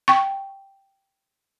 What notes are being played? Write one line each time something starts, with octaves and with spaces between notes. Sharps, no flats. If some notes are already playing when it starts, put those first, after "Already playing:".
G5 C#6